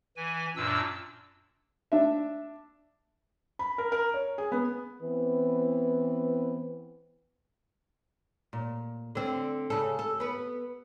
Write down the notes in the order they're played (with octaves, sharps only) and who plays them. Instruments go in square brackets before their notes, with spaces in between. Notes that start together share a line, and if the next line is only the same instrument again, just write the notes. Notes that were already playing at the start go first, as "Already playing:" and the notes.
[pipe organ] E3 G#5
F#2 A#2 D4 E6
[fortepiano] D4 E5
[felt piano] B5
A#4
A#4
C#5
G#4
B3
[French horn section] E3 B3 C4 B4
[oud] A#2
D3 C4
C#3 A4
A4
B3 B4